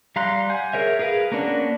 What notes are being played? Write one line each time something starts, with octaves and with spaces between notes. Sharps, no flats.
G3 F5 A#5 C6 F#6
F#5 G#5 G6
G#4 A#4 C#5 E5
G#4 A#4 B4 F5
A#3 B3 C#4 D4 F#4